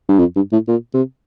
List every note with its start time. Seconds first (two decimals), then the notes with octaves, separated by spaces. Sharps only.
0.08 G2
0.19 F2
0.36 G2
0.53 A2
0.68 A#2
0.94 C3